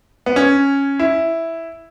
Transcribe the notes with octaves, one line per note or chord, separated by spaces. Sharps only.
B3
C#4
E4